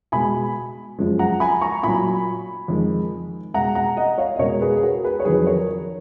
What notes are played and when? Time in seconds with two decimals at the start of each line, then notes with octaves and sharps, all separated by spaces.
0.12 B2 G#3 G#5 B5
0.99 F#2 F3 G#3
1.19 F#5 A#5
1.40 G#5 B5
1.61 A#5 C#6
1.83 A#2 F#3 G#5 B5
2.68 F2 D#3 G#3
3.54 B2 G#3 F#5 A#5
3.75 F#5 A#5
3.97 D#5 F#5
4.18 C#5 F5
4.36 D#5
4.39 B2 G#3 A#4 C#5
4.61 G#4 B4
4.76 G#4
4.82 F#4 A#4
5.04 G#4 B4
5.20 C#5
5.25 F2 D#3 F#3 G#4 B4
5.47 A#4 C#5